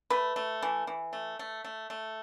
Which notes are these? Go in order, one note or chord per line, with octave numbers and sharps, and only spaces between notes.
A3 B4
A3
E3
E3
A3
A3
A3
A3